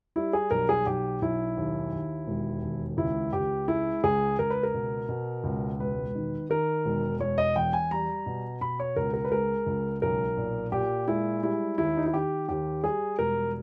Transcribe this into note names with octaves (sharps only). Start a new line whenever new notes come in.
G3 E4
G#4
B1 A#4
G#4
B1 G4
B1 E4
D#2
D#2
E1
D#2
C#2 E4
C#2 G4
G#3 E4
C#2 G#4
C#2 A#4
B4
A#4
B2
B2
C#2
E1 B4
D#3
D#3 A#4
E1
E1 C#5
D#5
E2 G5
G#5
G3 A#5
B2
B2 B5
C#5
C#2 A#4
A#4
B4
G#3 A#4
C#2
B1 A#4
A#2
A#2 G4
G#3 E4
G3 E4
D#2 E4
D#4
E4
D#3 G4
D#2 G4
G3 G#4
E1 A#4